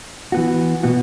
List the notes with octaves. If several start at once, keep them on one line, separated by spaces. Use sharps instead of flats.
E3 B3 F#4
B2 B3 F#4